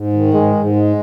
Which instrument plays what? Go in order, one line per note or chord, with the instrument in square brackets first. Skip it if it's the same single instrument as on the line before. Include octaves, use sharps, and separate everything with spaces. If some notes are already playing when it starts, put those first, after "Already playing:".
Already playing: [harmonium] G#2
D#3
[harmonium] G#2 [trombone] G#3
[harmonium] G#2
G#3